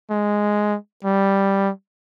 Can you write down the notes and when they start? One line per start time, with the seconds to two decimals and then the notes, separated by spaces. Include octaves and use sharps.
0.10 G#3
1.04 G3